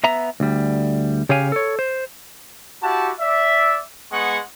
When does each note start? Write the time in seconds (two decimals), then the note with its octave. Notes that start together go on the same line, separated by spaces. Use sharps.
0.04 B3 E5 A#5
0.40 D2 G3
1.29 C#3 G4 C#5 F5 G#5
1.52 A4 C#5
1.79 C5
2.82 E4 F#4 G4 F#5 A5
3.20 D5 E5
4.12 G#3 B3 F#5 C#6